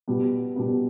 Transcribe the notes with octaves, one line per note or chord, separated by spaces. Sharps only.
B2 G3 B3
B2 G3 B3